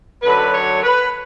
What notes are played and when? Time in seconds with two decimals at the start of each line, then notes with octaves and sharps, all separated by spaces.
0.22 F#2 D3 F#3 B4
0.52 C#5
0.83 B4